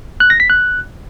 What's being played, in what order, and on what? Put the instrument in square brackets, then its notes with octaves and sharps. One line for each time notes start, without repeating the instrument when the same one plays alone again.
[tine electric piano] F#6
A#6
B6
F#6